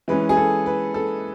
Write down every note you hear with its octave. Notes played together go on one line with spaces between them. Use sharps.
E3 G#3 C#4 B4
G#4
A4
B4
A4